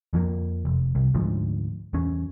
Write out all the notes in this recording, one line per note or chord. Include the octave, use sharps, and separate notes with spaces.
F2 F3 F#3 A#3
F1
C2
D2 G#2 F3
E2 C#4